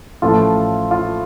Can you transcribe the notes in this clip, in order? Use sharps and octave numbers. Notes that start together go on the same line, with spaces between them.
A1 A2 F3 F4 A4
F4